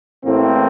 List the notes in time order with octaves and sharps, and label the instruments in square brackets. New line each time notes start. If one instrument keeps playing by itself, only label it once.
[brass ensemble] A1 A2 E3 A#3 C4